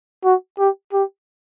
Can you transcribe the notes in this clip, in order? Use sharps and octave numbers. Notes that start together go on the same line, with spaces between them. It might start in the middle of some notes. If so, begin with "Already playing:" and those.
F#4
G4
G4